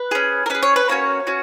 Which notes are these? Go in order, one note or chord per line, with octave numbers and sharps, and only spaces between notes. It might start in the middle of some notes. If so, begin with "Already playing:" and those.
Already playing: B4
C#4 G#4
A#4
C#4 G#4 B4
C#5
B4
A#3 C#4 F#4 C#5
C#4 F#4